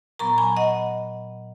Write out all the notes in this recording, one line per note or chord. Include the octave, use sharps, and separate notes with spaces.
A#2 F#3 B3 A#5 C#6
G#5 B5
D#5 F#5